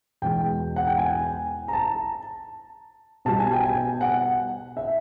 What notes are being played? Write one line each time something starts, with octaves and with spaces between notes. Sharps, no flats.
E2 B2 G#3 G5
F#5
G5
G#5
A#5
A5
B2 G3 A5
G#5
G5
G#5
F#5
E5